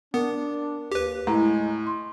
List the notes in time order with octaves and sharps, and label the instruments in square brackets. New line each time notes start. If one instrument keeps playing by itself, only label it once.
[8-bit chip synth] B3 [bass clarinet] D4 [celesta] A#4
[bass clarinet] D#2 [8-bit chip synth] G4 B4
[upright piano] A2 [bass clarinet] G#3 [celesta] A#5
[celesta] C6